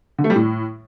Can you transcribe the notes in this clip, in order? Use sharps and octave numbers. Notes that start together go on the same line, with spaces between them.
D3
A3
G3
A2